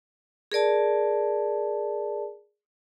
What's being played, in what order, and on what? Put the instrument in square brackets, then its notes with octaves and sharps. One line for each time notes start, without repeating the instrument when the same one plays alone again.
[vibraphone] G#4 A#4 D5 A5